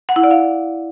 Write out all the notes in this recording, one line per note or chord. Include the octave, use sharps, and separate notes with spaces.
F#5
E4
D5
F5